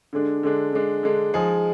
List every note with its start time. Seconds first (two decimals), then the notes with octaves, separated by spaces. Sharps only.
0.13 D3 G#3 D4
0.43 D3 G#3 D4
0.73 D3 G#3 D4
1.03 D3 G#3 D4
1.34 F3 G#3 D#4 G#4